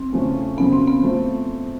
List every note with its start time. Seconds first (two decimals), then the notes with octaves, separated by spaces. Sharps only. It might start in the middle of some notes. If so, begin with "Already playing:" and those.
Already playing: C4
0.13 E2 C#3 F3 A3 C#4
0.57 F#2 C#3 F3 B3
0.73 C4
0.88 B3
1.02 F3 A3 C4 F4